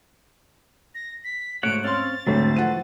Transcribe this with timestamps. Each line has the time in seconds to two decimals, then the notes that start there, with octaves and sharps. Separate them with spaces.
0.95 A#6
1.24 B6
1.63 G#2 A3 F#4 C#5 F#5 D7
1.84 C4 C#4 C#5 F5 C6 A6
2.27 D2 G#2 D3 F#3 A3 C4 C5 C#5
2.56 E3 F3 F#5 D#7